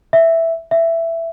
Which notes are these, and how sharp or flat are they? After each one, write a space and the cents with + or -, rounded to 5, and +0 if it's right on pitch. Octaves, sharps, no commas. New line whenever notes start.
E5 +0
E5 +10